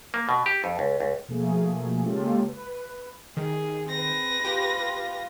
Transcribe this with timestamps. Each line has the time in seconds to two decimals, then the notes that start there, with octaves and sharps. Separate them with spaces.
0.14 A#3
0.29 B2
0.46 G4
0.64 F2
0.79 C#2
1.00 C#2
1.28 B2 F3 A3 A#3 G#4
2.04 C#3 G#3 A#3 F4 G4 A4
2.48 B4
3.37 D#3 G#4
3.89 C4 B4 A#6
4.45 F4 G4